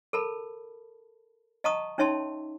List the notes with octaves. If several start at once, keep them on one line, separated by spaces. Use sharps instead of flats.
A4 A#4 A5 B5
D#5 F#5 A5 A#5 C#6 D#6
C#4 D#4 C#5 E5 A5 C6